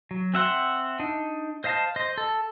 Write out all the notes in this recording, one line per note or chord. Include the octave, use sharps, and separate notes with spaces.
F#3
C4 E5 F#5 C6
D4 D#4
C5 D#5 F5 A5
C5 D#5
A4